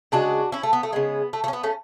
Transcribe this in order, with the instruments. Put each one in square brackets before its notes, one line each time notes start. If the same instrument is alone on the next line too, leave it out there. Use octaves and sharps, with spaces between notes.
[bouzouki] C#3 G#3 D4 F#4
C#4 E4
A3
B3
A3
C#3 G#3 B3
A3
A3
C#4
B3
A3 C#4